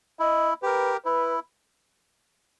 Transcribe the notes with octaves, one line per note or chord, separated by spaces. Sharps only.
E4 D#5
G4 A#4 B4
E4 B4